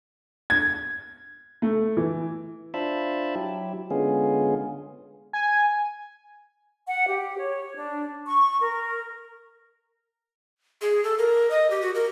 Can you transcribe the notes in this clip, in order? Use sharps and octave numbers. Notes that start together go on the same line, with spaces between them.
G#6
A3
E3
D4 F4 C5 E5 A5 B5
F#3 E4 G4
D3 G#3 B3 C#4 F4 G#4
G#5
F#5
G4
C#5
D4
C#6
A#4
G#4
A4
A#4
D#5
G4
F#4
A#4